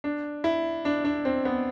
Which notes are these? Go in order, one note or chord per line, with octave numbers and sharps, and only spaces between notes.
D4
E4
D4
D4
C4
B3